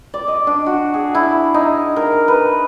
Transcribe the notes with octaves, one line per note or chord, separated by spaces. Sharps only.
D5
D#5
D4
F#4
G#4
E4
D#4
A#4
B4